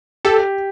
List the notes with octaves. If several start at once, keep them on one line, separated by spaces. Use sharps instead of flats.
G4 A4